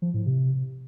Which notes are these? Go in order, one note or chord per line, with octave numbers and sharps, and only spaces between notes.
F3
A2
C3